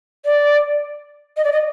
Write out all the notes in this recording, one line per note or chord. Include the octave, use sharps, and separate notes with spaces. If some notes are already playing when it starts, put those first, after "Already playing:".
D5
D#5
D5
D#5